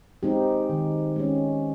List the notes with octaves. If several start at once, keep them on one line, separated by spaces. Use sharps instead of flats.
G#3 C4 D#4 G4
D#3
G#3 C#4